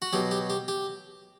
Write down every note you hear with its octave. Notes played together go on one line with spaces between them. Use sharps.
F#4
B2 F#3 G4
G4
G4
G4